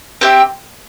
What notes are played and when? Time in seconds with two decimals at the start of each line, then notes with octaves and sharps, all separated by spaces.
0.21 C4 G4 E5